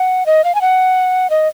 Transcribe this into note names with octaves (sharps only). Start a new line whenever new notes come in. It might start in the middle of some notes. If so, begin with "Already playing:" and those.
Already playing: F#5
D#5
F5
G#5
F#5
D#5